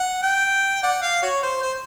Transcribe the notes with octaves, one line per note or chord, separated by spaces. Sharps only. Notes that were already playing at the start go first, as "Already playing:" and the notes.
Already playing: F#5
G5
D5 F#5
F5
F#4 C#5
C5
C5